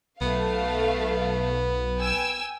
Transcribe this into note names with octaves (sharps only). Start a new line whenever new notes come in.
B1 A3 B3 F5
G5 G#5 E6